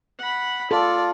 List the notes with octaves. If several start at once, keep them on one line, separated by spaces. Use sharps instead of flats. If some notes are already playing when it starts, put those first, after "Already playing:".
F#5 B5
F4 A4 D5